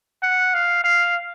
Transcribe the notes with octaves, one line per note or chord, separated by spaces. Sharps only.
F#5
F5
F5